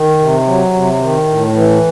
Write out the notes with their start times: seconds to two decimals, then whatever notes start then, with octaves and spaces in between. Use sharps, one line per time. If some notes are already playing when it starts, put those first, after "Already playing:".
Already playing: D#3
0.20 C3
0.47 F#3
0.73 C3
1.00 D#3
1.28 A2
1.54 E3